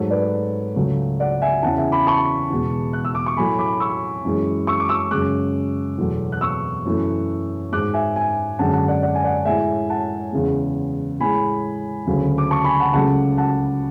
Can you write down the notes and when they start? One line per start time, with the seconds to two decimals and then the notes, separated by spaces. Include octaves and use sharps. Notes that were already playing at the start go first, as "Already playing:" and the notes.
Already playing: G#2 F#3 A3 A4 C#5
0.10 B4 D5
0.76 C#2 C#3 F#3 A3
1.20 D5 F#5
1.42 E5 G#5
1.63 E2 C#3 E3 F#5 A5
1.78 E5 G#5
1.92 B5 D6
2.07 A5 C#6
2.50 E2 B2 G#3
2.93 F#6
3.05 E6
3.15 D6
3.26 C#6
3.37 A2 F#3 A3 G#5 B5
3.59 B5 D6
3.80 C#6 E6
4.25 F#2 E3 G#3
4.67 C#6 E6
4.80 D6
4.89 C#6 E6
5.11 F#2 C#3 G#3 D6 F#6
5.98 E2 B2 F#3 A3
6.32 F#6
6.41 C#6 E6
6.85 F#2 E3 A3
7.72 G#2 G#3 D6 F#6
7.94 E5 G#5
8.16 E5 G#5
8.59 F#2 D3 G#3 F#5 A5
8.73 F#5 A5
8.88 D5 F#5
9.02 D5 F#5
9.15 G#5
9.24 D5 F#5
9.45 A2 G#3 E5 G#5
9.89 F#5 A5
10.32 E2 C#3 G#3
11.20 A2 G#3 G#5 B5
12.07 D2 C#3 F#3 A3
12.38 D6
12.50 A5 C#6
12.64 G#5 B5
12.80 F#5 A5
12.93 C#2 C#3 F#3 A3 F#5 A5
13.37 F#5 A5